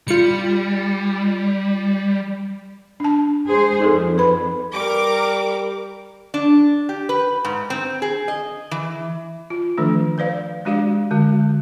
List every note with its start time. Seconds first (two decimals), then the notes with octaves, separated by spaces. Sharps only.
0.08 G3 F4 C#7
3.00 D4 A5
3.48 G#3 G#4 C5
3.80 F2 D#4 G#4 A4
4.18 B4 B5
4.73 G3 A#4 D6
6.34 D4
6.89 G4
7.09 B4
7.45 G#2
7.70 C4
8.02 G#4
8.28 D#5
8.71 E3
9.50 F4
9.77 D#3 F3 A3 D4 A4
10.18 B4 C5 D5 F5
10.65 G#3 D4 F#4 G4 D5 F5
11.11 D3 G#3 F#4